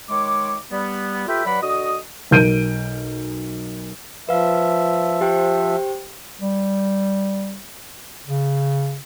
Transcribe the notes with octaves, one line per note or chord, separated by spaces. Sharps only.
D#3 G#3 C#5 D6
G3 B3
A3 F4 G4 B4 E5 G5
G2 F#3 D5 F#5 B5
D3 F#4 D#5 D#6
B1 A#4 G6 D7 D#7
F3 B4 E5 F5
G4 C5 G5
G3
C#3